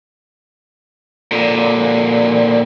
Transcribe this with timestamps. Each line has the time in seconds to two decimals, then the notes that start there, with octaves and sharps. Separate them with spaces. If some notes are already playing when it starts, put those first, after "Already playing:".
1.32 A#2 D3